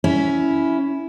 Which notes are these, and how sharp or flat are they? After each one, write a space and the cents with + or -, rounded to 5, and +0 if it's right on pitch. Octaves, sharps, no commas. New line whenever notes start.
C#4 +15 E4 -5